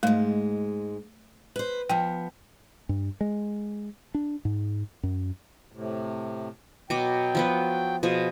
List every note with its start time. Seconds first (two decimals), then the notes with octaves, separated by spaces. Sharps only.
0.03 G#2 G#3 A3
1.56 B4 C5
1.89 F3 B3 G5
2.89 G2
3.21 G#3
4.15 D4
4.45 G#2
5.03 F#2
5.72 A2 C3
6.90 B2 F#3 G5 D6
7.35 F3 B3 B4
8.03 B2 F3 G#4